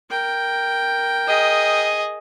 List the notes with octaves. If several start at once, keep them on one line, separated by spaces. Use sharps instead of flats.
A#4 G5
G#4 D#5